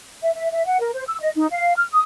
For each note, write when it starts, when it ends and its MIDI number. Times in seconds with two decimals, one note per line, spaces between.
0.22 0.31 76
0.35 0.48 76
0.52 0.66 76
0.66 0.80 78
0.80 0.90 70
0.94 1.04 72
1.07 1.17 88
1.21 1.30 75
1.35 1.47 63
1.51 1.73 77
1.77 1.85 89
1.91 2.03 87